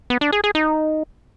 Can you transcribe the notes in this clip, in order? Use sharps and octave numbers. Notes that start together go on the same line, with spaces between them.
B3
D4
G#4
G#4
D#4